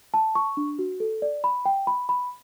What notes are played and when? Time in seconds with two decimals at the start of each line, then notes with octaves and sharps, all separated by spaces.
0.14 A5
0.35 C#6
0.57 D4
0.79 F#4
1.00 A4
1.22 D5
1.44 B5
1.65 G5
1.87 B5
2.09 B5